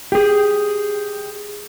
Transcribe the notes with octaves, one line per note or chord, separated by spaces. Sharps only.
G4 G#4